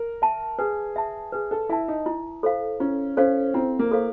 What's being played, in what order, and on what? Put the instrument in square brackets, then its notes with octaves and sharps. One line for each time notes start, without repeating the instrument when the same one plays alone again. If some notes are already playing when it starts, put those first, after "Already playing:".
Already playing: [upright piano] A#4
[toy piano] E5 A5
[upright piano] G#4 [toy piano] B4
[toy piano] E5 A5
[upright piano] G#4 [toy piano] B4
[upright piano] A4
[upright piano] E4 [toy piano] E5 A5
[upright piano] D#4
[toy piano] E4
A4 C5 F5
[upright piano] C#4 [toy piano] E4
[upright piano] C#4 [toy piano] A4 C5 F5
[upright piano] C4 [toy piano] E4
[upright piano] A#3
[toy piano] A4 C5 F5